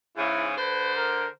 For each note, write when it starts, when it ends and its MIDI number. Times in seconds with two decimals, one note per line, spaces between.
0.17 0.55 44
0.17 0.55 49
0.17 0.46 64
0.57 1.27 50
0.57 0.95 71
0.57 1.27 72
0.96 1.28 70